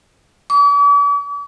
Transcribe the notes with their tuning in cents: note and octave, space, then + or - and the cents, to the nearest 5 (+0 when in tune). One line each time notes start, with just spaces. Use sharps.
D6 -45